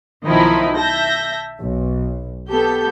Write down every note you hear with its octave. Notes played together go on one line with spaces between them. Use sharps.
B1 D#3 F3 D#4 E4 B5
E5 A5 G6 A#6
B1
B3 G4 A4 G6